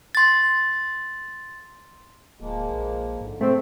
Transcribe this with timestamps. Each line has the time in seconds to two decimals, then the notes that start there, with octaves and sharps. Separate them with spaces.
0.15 C6 A6
2.41 D1 F3 G#3 A#3
2.70 A#1
3.21 G#2 D3
3.41 E2 A#2 A3 C4